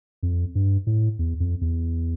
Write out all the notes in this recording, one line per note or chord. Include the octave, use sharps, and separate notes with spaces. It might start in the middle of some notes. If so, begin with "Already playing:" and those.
F2
G2
A2
E2
F2
E2